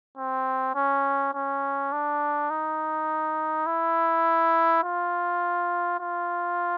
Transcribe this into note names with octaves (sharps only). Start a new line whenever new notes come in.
C4
C#4
C#4
D4
D#4
E4
F4
F4